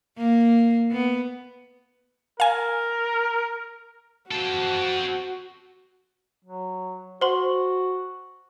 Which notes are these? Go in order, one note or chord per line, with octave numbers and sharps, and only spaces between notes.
A#3
B3
A#4 F5 G#5
C4 F#4 A4
F#3
F#4 C5 F#5 C6